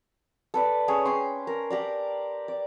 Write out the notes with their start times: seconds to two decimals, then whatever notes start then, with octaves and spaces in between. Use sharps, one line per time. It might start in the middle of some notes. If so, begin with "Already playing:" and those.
0.54 A4 B4 D5
0.88 C#4 G#4 C#5
1.05 C#4 G5 C6
1.47 A#4
1.70 G4 A#4 D5
2.48 D5